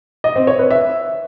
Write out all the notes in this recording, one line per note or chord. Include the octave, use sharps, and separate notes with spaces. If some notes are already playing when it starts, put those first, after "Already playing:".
D#5
C4
C#5
B4
E5